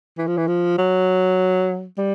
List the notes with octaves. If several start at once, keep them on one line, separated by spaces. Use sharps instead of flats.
E3
F3
E3
F3
F#3
G3